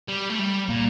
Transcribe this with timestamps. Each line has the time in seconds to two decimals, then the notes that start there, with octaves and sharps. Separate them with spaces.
0.08 G3
0.30 A3
0.39 G3
0.69 A#2 A#3